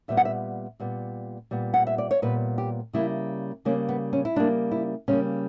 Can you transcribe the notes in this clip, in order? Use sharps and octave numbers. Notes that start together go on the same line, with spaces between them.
A#2 G3 B3 E5
F#5
E5
A#2 G3 B3
A#2 G3 B3
F#5
E5
D5
C#5
A#2 G3 B3 B4
G4
C#3 G3 A#3 E4
C#3 G3 A#3 C#4
B3
C#4
E4
C#3 G3 A#3 D4
E4
C#3 G3 A#3 C#4